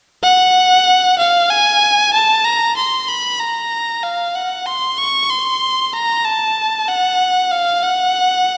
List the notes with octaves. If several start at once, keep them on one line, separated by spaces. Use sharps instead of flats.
F#5
F5
G#5
A5
A#5
C6
B5
A#5
F5
F#5
C6
C#6
C6
A#5
A5
F#5
F5
F#5